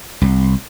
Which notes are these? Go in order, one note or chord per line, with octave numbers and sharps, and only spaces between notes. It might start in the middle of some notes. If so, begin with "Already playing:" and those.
C2